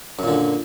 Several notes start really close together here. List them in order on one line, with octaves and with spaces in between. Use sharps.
F#2 A#2 D3